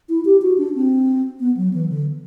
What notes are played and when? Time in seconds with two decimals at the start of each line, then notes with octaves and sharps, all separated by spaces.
0.09 E4
0.25 G4
0.42 F#4
0.58 D4
0.75 C4
1.40 B3
1.57 F#3
1.73 E3
1.89 D3